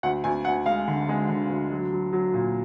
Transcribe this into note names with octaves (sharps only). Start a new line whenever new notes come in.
D2 F#5
D2 G#5
D2 F#5
G#3 F5
D3
G#3
D3
D2
F#3
F#3
F#3
A#2